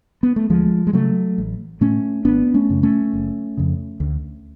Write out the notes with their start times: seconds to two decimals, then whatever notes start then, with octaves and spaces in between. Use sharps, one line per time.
0.23 B3
0.36 A3
0.49 D2 F3 G#3
0.87 G#3
0.93 C#3 F#3 A3
1.38 A1
1.81 A2 A3 C#4
2.25 G#1 B3 D4
2.54 A3 C#4
2.69 F#2 C#3
2.83 A3 C#4
3.13 F#1
3.57 F2 C#3
4.00 D2